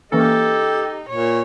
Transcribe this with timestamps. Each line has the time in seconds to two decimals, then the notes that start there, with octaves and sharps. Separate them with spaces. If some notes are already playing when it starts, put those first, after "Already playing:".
0.12 E3 A#3 C#4 D#4 G4 A4
1.09 A#2 C#5